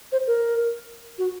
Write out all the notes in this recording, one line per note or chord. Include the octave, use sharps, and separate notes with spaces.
C5
A#4
F#4